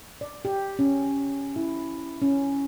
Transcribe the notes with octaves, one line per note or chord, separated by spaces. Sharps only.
D5
G4
C#4
E4
C#4